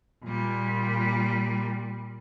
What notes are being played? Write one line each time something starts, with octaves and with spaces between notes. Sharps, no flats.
A#2 G3